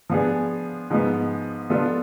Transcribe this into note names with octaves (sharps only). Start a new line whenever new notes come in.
F3 B3 D4 G#4
G#2 F3 G#3 B3
F3 B3 D4 F4 A4